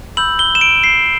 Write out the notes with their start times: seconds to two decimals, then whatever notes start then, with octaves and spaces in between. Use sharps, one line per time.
0.17 B5 E6 G6 F#7
0.39 G7
0.55 E7
0.61 D7
0.84 C7